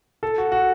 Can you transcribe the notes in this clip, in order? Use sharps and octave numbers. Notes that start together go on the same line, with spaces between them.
A4
F#4
F#4